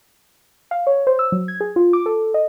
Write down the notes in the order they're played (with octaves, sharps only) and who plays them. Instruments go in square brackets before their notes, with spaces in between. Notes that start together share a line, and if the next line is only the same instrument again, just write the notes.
[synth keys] F5
C#5
C5
E6
F#3
G#6
G#4
F4
D6
A4
D#5